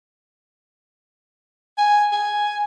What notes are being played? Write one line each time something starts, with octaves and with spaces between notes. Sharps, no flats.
G#5
G#5